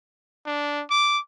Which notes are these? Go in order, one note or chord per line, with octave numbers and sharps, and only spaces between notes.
D4
D6